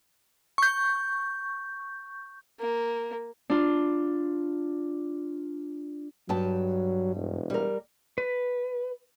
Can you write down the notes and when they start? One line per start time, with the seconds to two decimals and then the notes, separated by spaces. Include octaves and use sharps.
0.58 C#6 G6
2.60 A#3
3.50 D4 F4
6.29 G2 F#3 G5 A5
7.16 E1
7.50 G3 A#4
8.18 B4